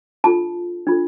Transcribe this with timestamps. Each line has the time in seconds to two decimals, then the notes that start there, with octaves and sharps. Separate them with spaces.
0.24 D4 F4 A4 A5
0.87 D4 F4 A4